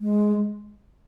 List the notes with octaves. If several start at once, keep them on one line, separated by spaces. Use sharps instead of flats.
G#3